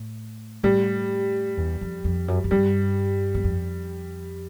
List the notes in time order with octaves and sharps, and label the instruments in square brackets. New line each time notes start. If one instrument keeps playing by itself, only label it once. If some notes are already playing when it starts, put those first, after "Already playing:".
Already playing: [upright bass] A2
[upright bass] A2 [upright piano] G3
[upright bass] E2
F2
F2
F#2
F#2
[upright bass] G2 [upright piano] G3
[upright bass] E2
F2